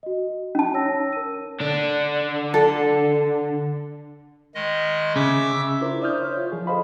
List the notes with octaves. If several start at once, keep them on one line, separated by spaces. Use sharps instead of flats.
F#4 D#5
C#4 D#4 A5
C#5 E6 A#6
A#4 D#7
D3 D4
A4
D#3 G#3 D#5
C#3 E5 D6 E6
D4 E4 F4 A#4 C5
C5 D5 E5 D#6 F6 G6
C#5
F4
F3 G#4
G#4 A4 C5 D#5 F5 B5